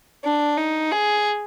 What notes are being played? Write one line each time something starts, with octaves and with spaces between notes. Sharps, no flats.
D4
D#4
G#4